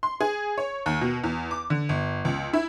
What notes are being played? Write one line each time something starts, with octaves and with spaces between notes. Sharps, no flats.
C6
G#4
C#5
D#2
B2
E2
D6
D3
G1
C#2
E4